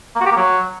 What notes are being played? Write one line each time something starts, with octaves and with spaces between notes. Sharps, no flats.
A#3
F#4
G4
A#3
F#3